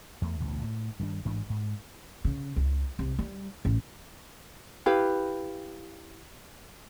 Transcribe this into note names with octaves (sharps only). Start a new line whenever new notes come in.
E2 A3
A1 D2 B2
A2
G2 D#3 D4
A1 G#2 E3 D4
G#2
C#3
C#2
C2
G3
A1
E4 G4 B4 F5